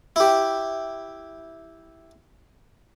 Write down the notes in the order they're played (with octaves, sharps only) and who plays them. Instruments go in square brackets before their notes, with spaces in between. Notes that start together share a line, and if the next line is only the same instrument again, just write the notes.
[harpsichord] E4 G4